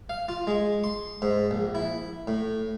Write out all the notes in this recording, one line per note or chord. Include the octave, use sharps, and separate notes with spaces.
F5
F4
G#3
C6
G#2
A#1
E4
A2